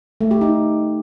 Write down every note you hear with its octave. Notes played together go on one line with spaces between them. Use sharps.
A3
G4
D#4